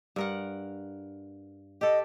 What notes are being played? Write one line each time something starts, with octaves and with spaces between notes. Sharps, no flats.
G2 A#4 F#5
G4 A4 D#5